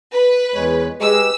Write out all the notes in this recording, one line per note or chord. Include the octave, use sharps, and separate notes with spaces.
B4
E2 G#3 C#5
G#3 G4 B4 E6